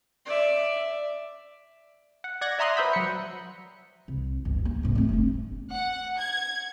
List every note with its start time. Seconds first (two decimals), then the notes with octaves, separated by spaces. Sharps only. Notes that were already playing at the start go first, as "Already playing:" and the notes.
0.26 D5 E5
2.24 F#5
2.41 D5 F#5 F#6 G#6 A#6
2.58 D5 E5 A#5 C6 D#6 F#6
2.77 B4 C5 E5 G5 B5
2.93 F#3 C#7
4.08 C2
4.45 G1 D2
4.65 A#3
4.83 C2 G#2
4.95 A3 C4
5.09 G1 D3
5.72 F#5
6.19 G#6